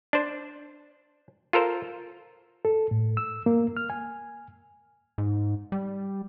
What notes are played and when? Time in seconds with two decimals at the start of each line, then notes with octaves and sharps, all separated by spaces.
0.13 D4 C5
1.53 F4 A4 A#4 C5
2.65 A4
2.91 A2
3.17 E6
3.46 A#3
3.77 F6
3.90 G#5
5.18 G#2
5.72 G3